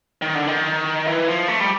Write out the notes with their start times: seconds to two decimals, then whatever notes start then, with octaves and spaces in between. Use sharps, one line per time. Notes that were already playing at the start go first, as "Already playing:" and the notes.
0.22 D#3
0.35 D3
0.47 D#3
1.07 E3
1.28 F3
1.48 A3
1.60 G3